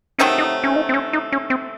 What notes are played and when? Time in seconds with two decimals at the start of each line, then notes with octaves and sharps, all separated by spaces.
0.19 C3 D#3 F#3 A3 C#4
0.38 D#4
0.64 C#4
0.76 D#4
0.89 C4
0.94 C#4
1.13 D#4
1.32 C#4
1.50 C4